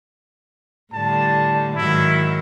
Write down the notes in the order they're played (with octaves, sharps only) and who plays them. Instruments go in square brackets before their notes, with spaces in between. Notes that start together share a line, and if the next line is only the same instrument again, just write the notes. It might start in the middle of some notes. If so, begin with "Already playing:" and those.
[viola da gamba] A2 D3 G3 [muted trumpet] A5
[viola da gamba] G#2 D#3 F#3 [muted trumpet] E4